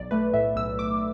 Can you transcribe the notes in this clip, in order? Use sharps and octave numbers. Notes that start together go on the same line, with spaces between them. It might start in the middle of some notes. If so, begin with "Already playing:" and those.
Already playing: B1 D5
A3 B4
A2 E5
B1 E6
B1 D6